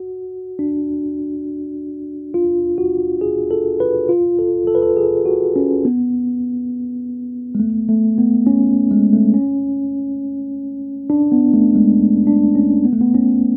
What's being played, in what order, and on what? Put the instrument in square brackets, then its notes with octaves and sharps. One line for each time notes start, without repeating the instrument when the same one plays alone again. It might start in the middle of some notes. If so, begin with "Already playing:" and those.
Already playing: [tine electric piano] F#4
D4
F4
F#4
G#4
A4
B4
F4
A4
A4
B4
A4
G#4
F#4
C#4
B3
G#3
A3
A3
B3
C#4
G#3
A3
C#4
D4
B3
A3
G#3
D4
C#4
B3
A3
B3
C#4